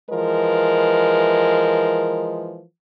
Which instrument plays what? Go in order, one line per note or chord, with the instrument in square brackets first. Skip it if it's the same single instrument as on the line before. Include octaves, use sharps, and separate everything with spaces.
[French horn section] E3 F3 G#3 A#4